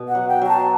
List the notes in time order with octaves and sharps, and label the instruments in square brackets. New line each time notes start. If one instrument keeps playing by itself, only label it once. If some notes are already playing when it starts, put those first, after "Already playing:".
Already playing: [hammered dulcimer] B2
[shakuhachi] F#5
[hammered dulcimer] F#3
[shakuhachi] G5
[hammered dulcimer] F#3 [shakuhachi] G5
[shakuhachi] A5